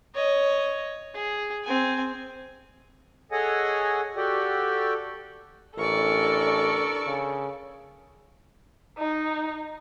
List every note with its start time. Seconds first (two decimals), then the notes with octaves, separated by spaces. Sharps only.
0.15 C#5 D#5
1.14 G#4
1.64 C4 G#5
3.32 G#4 A4 C#5 D#5 F#5 G#5
4.16 F#4 G4 A4 D5 G5
5.78 A1 D4 A4 A#4 D5 C#6
7.07 C#3
8.98 D#4